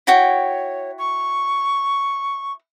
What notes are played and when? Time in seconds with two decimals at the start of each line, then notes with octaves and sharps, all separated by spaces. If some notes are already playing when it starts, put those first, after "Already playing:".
0.07 E4 F#4 C#5 G5
0.98 C#6